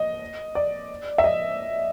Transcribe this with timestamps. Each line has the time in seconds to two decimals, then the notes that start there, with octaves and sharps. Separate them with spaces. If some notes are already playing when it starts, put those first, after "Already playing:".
Already playing: D#5
0.55 D5
1.18 E5
1.24 D#5